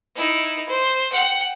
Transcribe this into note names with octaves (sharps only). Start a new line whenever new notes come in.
D#4 E4
C5
F#5 G5